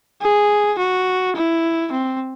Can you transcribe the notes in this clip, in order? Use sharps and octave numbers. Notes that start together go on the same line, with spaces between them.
G#4
F#4
E4
C4